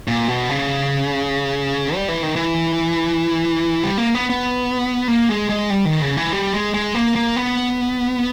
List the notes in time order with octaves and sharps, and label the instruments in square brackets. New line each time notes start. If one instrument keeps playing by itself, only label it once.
[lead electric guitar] A#2
B2
C#3
G3
E3
D#3
E3
G3
A#3
B3
B3
A#3
G#3
G#3
G3
D#3
C#3
E3
G3
G#3
G#3
A#3
A#3
B3